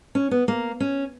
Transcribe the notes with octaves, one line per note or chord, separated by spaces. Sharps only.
C#4
B3
A#3
C#4